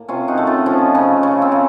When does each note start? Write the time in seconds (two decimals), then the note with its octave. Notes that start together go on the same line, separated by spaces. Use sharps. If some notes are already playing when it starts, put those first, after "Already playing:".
Already playing: A2 A#3
0.08 C3 C#4 F4
0.28 D#4 F#4
0.38 A3
0.47 C#4 F4
0.66 F3 C#4
0.95 C#3
1.23 C#3 C#4
1.42 C4
1.52 C#3